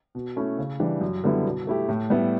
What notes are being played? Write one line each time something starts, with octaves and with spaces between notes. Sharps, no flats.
B2
A3 C#4 E4
C#3
E3 G3 D4 G4
F#2
D3 G3 B3 E4
B2
A3 E4 G4
A2
G3 B3 E4